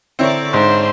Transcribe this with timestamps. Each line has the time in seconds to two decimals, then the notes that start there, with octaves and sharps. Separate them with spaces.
0.19 D3 C4 E4 A#4 C#5 D5
0.53 G#2 D4 C5